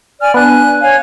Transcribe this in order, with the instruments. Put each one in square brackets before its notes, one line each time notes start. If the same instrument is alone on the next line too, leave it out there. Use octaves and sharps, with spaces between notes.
[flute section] D5 G#5 F6
[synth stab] B3 D4 [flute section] G#5 F#6
[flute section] C#5 F5 G#5